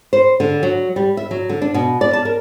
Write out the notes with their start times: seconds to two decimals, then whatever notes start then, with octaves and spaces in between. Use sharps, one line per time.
0.13 C5
0.40 D3
0.63 F#3
0.96 G3
1.17 E5
1.31 F#3
1.49 D3
1.62 D4
1.74 B2
2.01 D5
2.13 A5
2.25 A#4